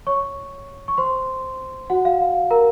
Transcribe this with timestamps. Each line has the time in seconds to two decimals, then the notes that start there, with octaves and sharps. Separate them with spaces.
0.07 C#5 C#6
0.88 C#6
0.98 C5 C6
1.90 F#4 F#5
2.05 F5
2.20 F5
2.50 A#4 A#5